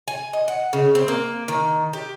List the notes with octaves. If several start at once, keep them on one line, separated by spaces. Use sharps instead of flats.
G#5
D#5
F#5
C#3
C4
A#3
D#3
G4